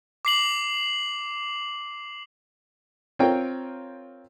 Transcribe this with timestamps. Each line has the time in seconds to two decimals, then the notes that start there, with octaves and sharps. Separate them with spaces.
0.25 D6 C7 F#7
3.19 C4 F4 A#4 C#5 G5